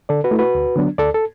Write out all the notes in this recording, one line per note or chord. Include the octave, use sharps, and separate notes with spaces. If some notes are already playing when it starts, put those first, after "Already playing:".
D3 A4 D5
F#4 B4
A3 E4
F#4 B4
D2
D3 F#3 B3 D4
D2 A4 D5
A4